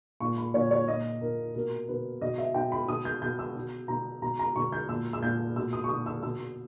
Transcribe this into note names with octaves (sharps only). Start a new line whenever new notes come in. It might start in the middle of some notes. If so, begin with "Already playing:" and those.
A#2 C#6
B5
A#2 C#5
C#5
A#2 D#5
A#2 A#4
B2 A#4
B2 B4
B2 D#5
E5
B2 G5
B5
B2 D#6
G6
B2 G6
E6
B2
B2 A#5
B2 A#5
A#5
B2 C#6
G6
A#2 E6
E6
A#2 G6
B2 E6
D#6
C#6
B2 D#6
E6
B2 E6